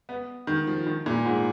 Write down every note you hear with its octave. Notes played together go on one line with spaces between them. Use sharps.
B3
D#3
F3
D#3
A#2
G#2